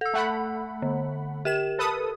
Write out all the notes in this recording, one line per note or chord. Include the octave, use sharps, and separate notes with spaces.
A4 E6
A3 F#5 B5
D3
G4 A#4 E7
A4 B4 D#6